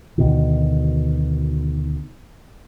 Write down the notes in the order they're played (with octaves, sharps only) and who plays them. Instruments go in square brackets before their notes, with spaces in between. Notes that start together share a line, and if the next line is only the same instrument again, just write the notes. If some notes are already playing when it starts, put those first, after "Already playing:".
[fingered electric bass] D2 B2 D#3